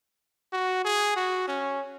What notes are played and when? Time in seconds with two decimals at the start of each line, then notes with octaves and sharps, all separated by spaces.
0.53 F#4
0.85 G#4
1.16 F#4
1.48 C#4